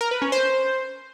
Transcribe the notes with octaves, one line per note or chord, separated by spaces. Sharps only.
A#4
B4
C#4
C5